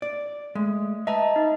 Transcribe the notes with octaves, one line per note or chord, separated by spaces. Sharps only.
D5
G#3 A3
B4 D#5 E5 A5 A#5
D#4